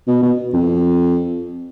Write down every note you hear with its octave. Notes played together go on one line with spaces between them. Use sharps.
B2
B2
F2